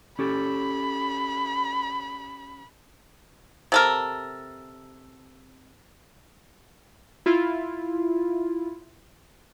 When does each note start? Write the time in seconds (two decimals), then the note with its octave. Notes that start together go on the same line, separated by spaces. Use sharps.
0.19 C#4 G4 A4 B5
3.72 C3 A4 A#4
7.26 E4 F4